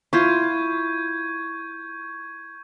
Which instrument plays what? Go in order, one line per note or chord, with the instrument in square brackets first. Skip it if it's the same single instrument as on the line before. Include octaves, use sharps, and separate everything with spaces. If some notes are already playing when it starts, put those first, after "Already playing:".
[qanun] E4 F4 [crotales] C#6 G6 G#6